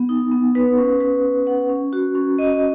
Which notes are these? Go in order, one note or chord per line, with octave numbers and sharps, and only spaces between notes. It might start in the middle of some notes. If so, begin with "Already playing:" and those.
Already playing: B3
D#4
B3
B4
C#4
B4
C#4
F#5
C#4
F#4
C#4
D#5